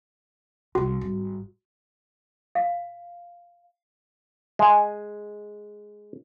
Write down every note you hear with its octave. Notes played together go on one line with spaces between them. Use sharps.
C2 G#3 F#4
G#1 G3
F5
G#3 G#5